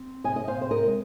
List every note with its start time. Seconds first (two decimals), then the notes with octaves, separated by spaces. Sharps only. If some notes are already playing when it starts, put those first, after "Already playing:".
Already playing: C4
0.24 C3 D#5 G#5
0.36 D#5
0.48 C5 F5
0.55 C3
0.61 C5
0.71 A#4 D#5
0.86 G#3